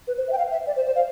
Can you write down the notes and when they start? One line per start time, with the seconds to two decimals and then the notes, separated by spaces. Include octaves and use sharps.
0.07 B4
0.17 C5
0.28 E5
0.33 G5
0.38 F5
0.51 E5
0.67 D5
0.76 C5
0.86 C5
0.95 F5